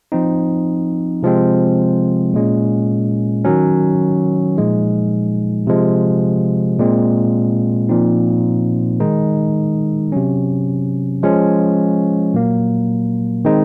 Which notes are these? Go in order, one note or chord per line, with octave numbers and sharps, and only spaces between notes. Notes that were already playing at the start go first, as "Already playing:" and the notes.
F3 C4 D#4
C3 F3 G#3 C4
A#2 G#3 C#4
D#3 F#3 C#4
A#2 F3 G#3 D#4
C3 F3 G#3
A#2 G#3 C4
A#2 F3 C4 D#4
D#3 G#3 D#4
C3 F#3 C#4
F3 G#3 C#4
A#2 F#3 A#3
D#3 G#3 C4 D#4